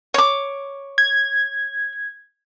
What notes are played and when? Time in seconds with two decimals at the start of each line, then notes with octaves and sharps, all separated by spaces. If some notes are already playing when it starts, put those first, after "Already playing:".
0.14 C#5 D6
0.98 G#6